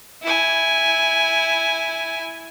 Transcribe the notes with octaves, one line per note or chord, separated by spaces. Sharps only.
E4 G#5